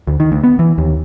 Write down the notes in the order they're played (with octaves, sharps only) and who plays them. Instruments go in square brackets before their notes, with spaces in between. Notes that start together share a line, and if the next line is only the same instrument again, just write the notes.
[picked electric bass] D2
D#3
D2
B3
E3
D#2